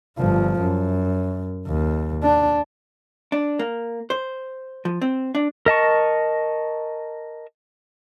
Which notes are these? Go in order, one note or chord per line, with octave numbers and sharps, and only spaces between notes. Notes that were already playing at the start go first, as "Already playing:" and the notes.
G1 F3
F#2
D#2
D4
D4
A#3
C5
F3
C4
D4
A#4 D#5 A5 C#6